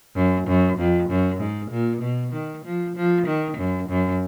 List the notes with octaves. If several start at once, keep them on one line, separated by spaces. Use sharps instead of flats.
F#2
F#2
F2
F#2
G#2
A#2
B2
D#3
F3
F3
D#3
F#2
F#2